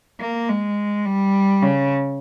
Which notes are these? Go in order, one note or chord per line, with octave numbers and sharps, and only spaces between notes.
A#3
G#3
G3
C#3